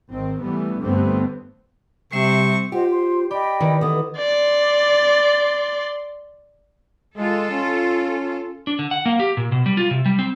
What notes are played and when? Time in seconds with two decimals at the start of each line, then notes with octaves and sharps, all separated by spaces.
0.12 G#1 D#3 C4
0.42 E3 G3 A3 B3
0.81 G2 D3 G3 A3 B3 C4
2.12 C3 G3 C4 E5 C#6
2.72 F4 G4 C5 D#5 F#5
2.91 C5 C6
3.31 G4 D5 D#5 G5 B5
3.60 D#3 E3
3.81 E3 B3 A4 D#6
4.18 D5 C6
7.17 G#3 F4 A4
7.51 C#4
8.67 D4
8.79 D3
8.91 F#5
9.06 A#3
9.19 G4
9.37 A#2
9.52 B2
9.66 G3
9.77 F4
9.91 C3
10.06 G3
10.19 C4